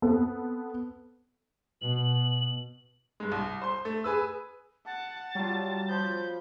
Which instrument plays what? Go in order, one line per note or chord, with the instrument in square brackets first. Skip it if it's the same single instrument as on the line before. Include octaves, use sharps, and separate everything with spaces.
[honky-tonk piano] B3 C4 A4
[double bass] B2 [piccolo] F#7
[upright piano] G2 G#3
C2
C5 C6
A3
G#4 B4 E6
[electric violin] F#5 [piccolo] A5
[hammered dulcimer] F#3 [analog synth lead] G3 [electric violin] F4
[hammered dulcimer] F3 [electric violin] B5 G6